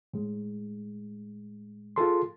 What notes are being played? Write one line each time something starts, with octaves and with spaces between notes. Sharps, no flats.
A2 G#3
F4 G#4 A4 C6